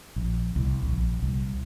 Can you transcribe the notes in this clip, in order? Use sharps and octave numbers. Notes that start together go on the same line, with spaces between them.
A#1
C2
A#1
C2